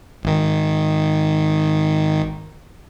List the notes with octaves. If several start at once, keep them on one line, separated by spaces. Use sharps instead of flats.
G#1 D#3